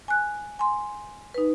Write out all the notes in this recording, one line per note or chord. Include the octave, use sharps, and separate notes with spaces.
G#5 F#6
G#5 C6
D#4 B4